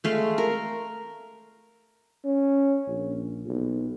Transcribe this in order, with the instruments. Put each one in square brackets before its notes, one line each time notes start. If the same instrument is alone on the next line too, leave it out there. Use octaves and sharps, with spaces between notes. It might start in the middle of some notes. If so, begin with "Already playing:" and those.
[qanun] G#3 A3 F5
A#4
[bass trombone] C#4
A#1
B1